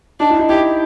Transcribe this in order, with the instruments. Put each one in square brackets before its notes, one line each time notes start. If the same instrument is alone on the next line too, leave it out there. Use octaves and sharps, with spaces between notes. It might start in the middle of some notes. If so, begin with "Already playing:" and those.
[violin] D4 [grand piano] D#4
[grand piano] E4
D#4
[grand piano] E4 [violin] G4